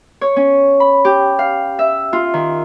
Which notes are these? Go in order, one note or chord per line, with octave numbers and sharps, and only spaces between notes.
C#5
C#4
B5
G4
F5
E5
F4
D#3